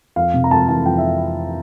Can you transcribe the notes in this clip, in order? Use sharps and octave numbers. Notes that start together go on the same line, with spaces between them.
F2 F5
C3
A#5
F2 A5
E3 A5
F2 G5
E5